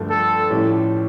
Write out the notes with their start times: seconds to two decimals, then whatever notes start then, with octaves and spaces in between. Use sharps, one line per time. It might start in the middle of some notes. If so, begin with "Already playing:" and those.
Already playing: G2 D3 F3 A3
0.10 A4
0.50 A2 F3 C#4 G4